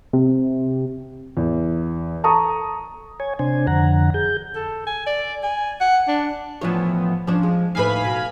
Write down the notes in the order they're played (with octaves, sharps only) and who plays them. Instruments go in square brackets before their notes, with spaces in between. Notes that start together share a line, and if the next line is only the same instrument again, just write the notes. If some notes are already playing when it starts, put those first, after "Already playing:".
[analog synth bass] C3
[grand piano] E2
A4 A5 A#5 C#6 D#6
[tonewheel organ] C#5 G#5
C3 D4 C5 G#5
F2 D3 F#5 A#5
G#4 G6
[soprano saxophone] A4
G#5
D5
G#5
F#5
D4
[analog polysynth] A2 F3 B3 [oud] E3 D4 C#5
[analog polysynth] F3 [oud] C#4 D4
[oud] G#3
[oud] D#2 A2 B4 [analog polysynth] F5 G#5 B5
[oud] B2